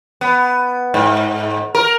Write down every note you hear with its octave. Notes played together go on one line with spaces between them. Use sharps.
B3
G#2
A#4